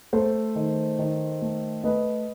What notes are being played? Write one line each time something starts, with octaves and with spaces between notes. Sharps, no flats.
A3 A4 C5
D#3
D#3
A3
A3 B4 D#5